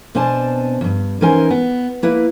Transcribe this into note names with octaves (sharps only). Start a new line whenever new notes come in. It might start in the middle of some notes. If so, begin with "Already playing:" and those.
B2 C4 D4 C5 G#5 A5
E2 G2
E3 C#4 D#4 A#4 C5 G#5
B3
A#3 E4 B4